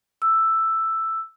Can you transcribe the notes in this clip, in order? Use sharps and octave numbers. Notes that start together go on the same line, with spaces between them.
E6